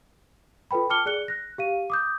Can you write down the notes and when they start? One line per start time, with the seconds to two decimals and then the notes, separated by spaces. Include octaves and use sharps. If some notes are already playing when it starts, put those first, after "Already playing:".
0.71 F4 A4 B4 G5 B5
0.89 G5 A5 D6 F6 C#7 G7
1.06 G#4 D5 F#6 C#7 G7
1.28 F#6 A#6
1.58 G4 F5 D#7
1.90 D6 D#6 G6